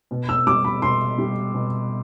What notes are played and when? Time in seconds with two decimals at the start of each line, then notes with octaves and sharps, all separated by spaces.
0.11 B2
0.29 E6
0.47 G3 D6
0.64 B5
0.82 B2 C6
1.18 G3
1.54 B2